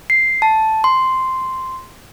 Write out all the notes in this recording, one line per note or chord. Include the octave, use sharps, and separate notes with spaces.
C7
A5
C6